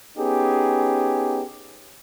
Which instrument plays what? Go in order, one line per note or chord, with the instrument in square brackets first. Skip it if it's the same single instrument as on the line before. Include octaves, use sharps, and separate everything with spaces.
[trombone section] B3 C#4 D#4 G4 G#4